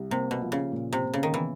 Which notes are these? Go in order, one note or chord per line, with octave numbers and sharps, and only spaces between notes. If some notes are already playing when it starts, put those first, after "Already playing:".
Already playing: C2
C3 A#3
B2
F3
C#3
A#2
C3
A#2
C#3
D#3
E3 B3